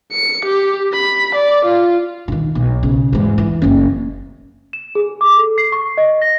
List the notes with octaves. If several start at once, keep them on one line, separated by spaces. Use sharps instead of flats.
C#7
G4
B5
D5
F4
D3 D#3
B1
C#3
E2 G#2
E3
F#1 C#4
E7
G#4
D6
A4
C7
C#6
D#5
A#6